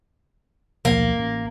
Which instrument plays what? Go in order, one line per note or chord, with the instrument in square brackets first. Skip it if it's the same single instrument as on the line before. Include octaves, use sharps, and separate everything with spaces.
[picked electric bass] D#1 B1 F3 [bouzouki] A#3
[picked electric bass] A1